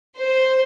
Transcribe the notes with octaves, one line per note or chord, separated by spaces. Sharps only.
C5